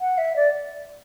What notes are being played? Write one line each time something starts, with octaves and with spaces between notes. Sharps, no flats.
F#5
E5
D5